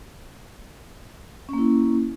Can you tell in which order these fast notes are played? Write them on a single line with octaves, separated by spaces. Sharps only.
C#4 A#3 E4